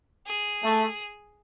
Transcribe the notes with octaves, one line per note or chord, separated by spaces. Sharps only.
G#4
A3